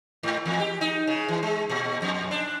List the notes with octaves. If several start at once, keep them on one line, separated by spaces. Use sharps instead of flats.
G#2
E2
G4
D#4
C#3
E3
G#3
A#2
F2
D4